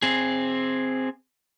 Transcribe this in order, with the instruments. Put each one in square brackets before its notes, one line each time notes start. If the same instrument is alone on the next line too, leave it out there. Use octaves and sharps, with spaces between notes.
[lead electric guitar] C4 G#4